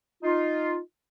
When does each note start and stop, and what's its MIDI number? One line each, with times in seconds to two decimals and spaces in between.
0.23 0.78 63
0.23 0.78 65